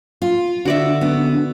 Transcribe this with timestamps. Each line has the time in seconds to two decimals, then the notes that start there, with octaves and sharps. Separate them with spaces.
0.22 F4
0.65 D3 F#4 D5 E5
1.01 B3